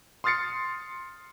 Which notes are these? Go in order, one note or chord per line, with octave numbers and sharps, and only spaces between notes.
C6 D#6 F6 A6 C7 C#7